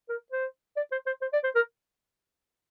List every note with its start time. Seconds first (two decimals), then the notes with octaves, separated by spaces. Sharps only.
0.09 A#4
0.32 C5
0.77 D5
0.92 C5
1.06 C5
1.22 C5
1.33 D5
1.44 C5
1.55 A#4